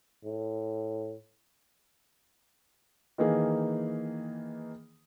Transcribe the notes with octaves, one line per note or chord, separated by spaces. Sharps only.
A2
D#3 E3 A#3 D#4 G#4